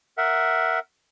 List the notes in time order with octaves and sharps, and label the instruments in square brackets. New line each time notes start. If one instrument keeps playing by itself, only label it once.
[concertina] A#4 E5 F#5